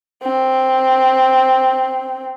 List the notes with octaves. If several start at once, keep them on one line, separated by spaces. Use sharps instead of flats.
C4